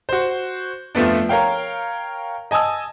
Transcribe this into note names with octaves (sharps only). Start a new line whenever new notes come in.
F#4 C5
F2 F3 A3 B3 D4
A#4 C#5 F5 G5
D#5 G#5 A5 D#6 E6